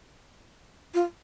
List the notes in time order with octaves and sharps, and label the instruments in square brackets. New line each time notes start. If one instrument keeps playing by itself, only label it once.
[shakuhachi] F4